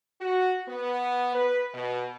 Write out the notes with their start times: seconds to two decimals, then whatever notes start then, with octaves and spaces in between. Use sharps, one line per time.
0.21 F#4
0.68 B3
1.34 B4
1.74 B2